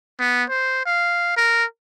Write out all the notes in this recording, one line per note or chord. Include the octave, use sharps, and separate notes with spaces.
B3
C5
F5
A#4